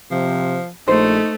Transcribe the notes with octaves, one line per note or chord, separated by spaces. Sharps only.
C3 F3
A#1 A3 D#4 C5